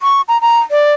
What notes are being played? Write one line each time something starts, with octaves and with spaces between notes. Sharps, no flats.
C#6
A#5
A#5
D5